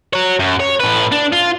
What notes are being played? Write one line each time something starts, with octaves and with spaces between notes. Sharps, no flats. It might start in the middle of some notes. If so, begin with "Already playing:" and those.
F#4 C#5
F#2
C#5
A2 B4
D4
F4